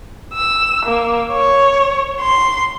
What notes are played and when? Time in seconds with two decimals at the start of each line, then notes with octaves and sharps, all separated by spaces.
0.33 E6
0.86 A#3
1.32 C#5
2.21 C6